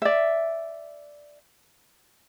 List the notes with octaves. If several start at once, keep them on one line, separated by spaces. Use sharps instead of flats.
D5 E5